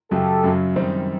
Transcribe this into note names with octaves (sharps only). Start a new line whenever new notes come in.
F#2 C#3 F#3 G4 A4
F#2 C#3 F#3
F#2 D#3 G3 C4 D#4